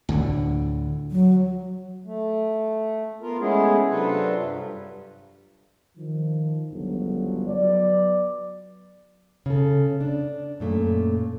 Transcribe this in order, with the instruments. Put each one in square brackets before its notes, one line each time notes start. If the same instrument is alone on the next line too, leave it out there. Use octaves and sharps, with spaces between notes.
[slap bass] D2 A2 D3
[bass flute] F#3
[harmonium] A3
B3 F4 A#4
G#3 A3 B3 C#4 E4 G#4
C3 F#3 D4 F4 A4 B4
G2
[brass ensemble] D#3 F3
G1 C#2 F3 F#3
F#3 B3 D5
[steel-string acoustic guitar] C#3 A4
D4
F#2 A#2 A3